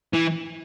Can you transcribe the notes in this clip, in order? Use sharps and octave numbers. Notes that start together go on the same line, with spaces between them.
E3